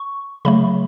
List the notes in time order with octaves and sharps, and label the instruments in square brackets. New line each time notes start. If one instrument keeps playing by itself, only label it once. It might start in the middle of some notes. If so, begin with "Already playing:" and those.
Already playing: [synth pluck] C#6
C#3 F#3 A3 B5